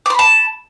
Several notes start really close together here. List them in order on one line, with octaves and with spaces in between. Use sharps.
D6 C6 B5 A5